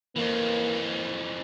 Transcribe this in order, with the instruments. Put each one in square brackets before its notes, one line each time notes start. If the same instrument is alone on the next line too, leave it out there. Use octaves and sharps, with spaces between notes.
[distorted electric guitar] F2 E3 [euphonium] A#3